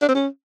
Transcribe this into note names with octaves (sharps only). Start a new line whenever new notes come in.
D4
C4
C#4